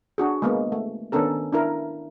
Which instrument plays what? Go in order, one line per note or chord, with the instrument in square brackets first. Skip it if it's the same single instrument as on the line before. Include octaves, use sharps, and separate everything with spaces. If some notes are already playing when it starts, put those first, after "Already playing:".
[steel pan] D4 F#4 G#4
G#3 A#3 B3
A3
D#3 B3 C#4 D4 A4 A#4
D4 E4 A#4